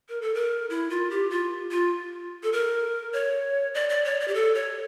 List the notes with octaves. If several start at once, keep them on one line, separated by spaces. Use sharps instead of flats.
A#4
A4
A#4
E4
F4
G4
F4
F4
A4
A#4
C#5
D5
D5
C#5
D5
G4
A4
C#5